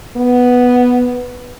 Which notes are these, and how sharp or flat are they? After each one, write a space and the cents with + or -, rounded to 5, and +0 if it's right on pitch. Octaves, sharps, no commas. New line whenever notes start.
B3 +0